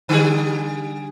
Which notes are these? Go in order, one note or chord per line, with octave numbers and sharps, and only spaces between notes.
D3 G3 G#4